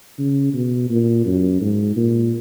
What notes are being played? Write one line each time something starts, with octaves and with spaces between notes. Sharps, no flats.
C#3
B2
A#2
F#2
G#2
A#2